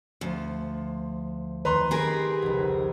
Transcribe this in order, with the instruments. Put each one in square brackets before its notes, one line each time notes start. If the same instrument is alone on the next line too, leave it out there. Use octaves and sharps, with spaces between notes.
[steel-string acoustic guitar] D2 F3
[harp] D#3 [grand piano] B4 A#5 C6
[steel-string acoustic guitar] G4 G#4 A#4 [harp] B5 A#6 C7
[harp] F1 C#2